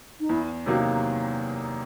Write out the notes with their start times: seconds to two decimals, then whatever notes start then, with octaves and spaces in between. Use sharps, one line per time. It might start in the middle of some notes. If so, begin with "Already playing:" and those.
0.20 D#4
0.29 E2 E4
0.66 C3 D#3 F#3 A#3 F#4